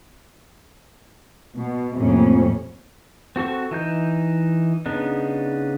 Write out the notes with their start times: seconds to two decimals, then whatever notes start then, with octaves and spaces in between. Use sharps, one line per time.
1.57 B2
1.99 F2 A2 C3 A#3 C#4
3.36 C4 F#4 A4 C#6
3.71 E3 D#4 G6
4.86 C#3 B3 D4 D#4